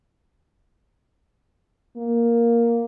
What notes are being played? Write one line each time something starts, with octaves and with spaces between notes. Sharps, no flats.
A#3